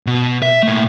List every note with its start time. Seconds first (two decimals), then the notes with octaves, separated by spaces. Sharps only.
0.06 B2
0.42 E5
0.63 A#2 A3